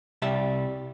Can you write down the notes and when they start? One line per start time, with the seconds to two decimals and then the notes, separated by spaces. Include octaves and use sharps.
0.22 C2 G3 E5 A5